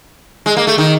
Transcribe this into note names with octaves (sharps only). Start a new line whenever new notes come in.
G#3
A#3
A3
D#3